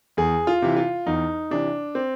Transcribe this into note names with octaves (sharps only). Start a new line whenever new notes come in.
E2 G#4
F4
C3 E3
F4
E2 D#4
C3 E3 D4
C4